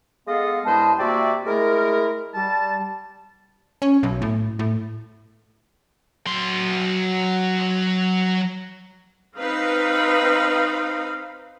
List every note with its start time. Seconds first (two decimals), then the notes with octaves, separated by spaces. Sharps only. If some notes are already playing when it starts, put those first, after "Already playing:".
0.27 G#3 B3 A4 D#5 F5
0.64 G2 G#3 E4 C5 D#5 A5
0.99 C3 A#3 F#4 D5 E5 G5
1.45 G#3 A3 E4 A#4
2.35 G3 A5
3.82 C#4
4.03 B1
4.22 A2
4.59 A2
6.26 F#3 C6
9.37 C4 D#4 B4 F5